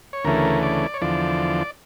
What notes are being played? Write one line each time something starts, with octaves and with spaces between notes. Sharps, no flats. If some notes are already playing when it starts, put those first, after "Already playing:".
C#5
D2 C#3 E3 A3 A#4
D5
C#5
E2 D3 F3 D5